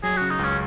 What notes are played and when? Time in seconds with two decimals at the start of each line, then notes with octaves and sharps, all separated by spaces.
0.03 F#3 G#4
0.17 C#3 F#4
0.30 D#4
0.39 C#2 C#4